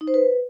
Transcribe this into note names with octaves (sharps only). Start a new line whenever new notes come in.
D#4
C5
B4